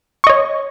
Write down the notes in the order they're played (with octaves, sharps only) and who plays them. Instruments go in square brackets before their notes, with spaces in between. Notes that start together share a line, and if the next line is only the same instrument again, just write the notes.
[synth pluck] C#6
D#5
C#5